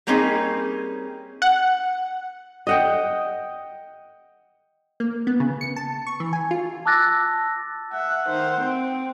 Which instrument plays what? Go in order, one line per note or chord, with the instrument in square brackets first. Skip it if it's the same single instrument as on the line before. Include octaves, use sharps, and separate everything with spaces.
[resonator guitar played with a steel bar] G3 A#3 C4 C#4 D#4 G#4
[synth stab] F#5
[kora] D#5 F#5 G5
[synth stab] A#3
B3
C#3
C#7
A5
C#6
E3
G#5
F4
[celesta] A5 D6 E6 F#6 A6 A#6
[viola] E5 [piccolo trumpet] F#5
[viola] D#3 C5
C4